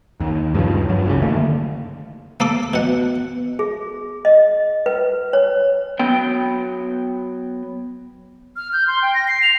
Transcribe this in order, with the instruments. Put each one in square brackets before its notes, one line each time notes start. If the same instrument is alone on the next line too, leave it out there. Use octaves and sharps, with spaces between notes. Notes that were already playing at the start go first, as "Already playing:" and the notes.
[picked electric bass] D#2
G2 C#3 F3
G2 F#3
F#1 C2 C#3
D3 D#3 A3 A#3
[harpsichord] A#3 A4 D6
[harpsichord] B2 F#5 [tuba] B3
[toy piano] G#4
D#5
B4
C#5
[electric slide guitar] F#3 B3 G5
[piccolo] F6
G6
C6
G5
A#6
C7
F7